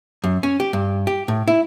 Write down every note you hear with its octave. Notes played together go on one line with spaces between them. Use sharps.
F#2
C#4
G4
G2
G4
A2
E4